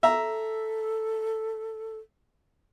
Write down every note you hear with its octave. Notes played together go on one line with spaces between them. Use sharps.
A4 E5 A#5